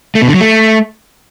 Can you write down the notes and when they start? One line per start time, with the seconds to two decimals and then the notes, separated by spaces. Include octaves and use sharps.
0.15 A3
0.22 B2
0.28 D3
0.34 F#3
0.41 A3